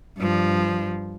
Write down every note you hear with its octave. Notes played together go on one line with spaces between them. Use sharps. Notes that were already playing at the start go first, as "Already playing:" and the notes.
G2 F3